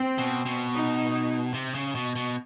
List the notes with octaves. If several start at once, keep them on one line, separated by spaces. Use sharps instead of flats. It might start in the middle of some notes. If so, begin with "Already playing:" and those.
Already playing: C4
B2
B2
D#4
C3
C#3
B2
B2